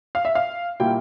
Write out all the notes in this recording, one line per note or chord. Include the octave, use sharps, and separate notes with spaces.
F5
E5
F5
A#2 G3 A#3 E4 G5